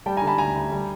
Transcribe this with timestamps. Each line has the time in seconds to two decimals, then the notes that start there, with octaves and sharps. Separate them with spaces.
0.06 G3 G5 A5
0.17 G#5 A#5
0.22 D3
0.27 A5 B5
0.38 D2 G#5 A#5
0.56 D2
0.72 G3